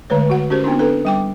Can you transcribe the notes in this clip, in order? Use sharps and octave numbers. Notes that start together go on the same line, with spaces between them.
D3 G#3 A3 B4 C#5
F#4 F#5
C#4 F#4 G4 A#4 C5
B3 C4 D4 E4
D4 A4 B4
G3 G5 D6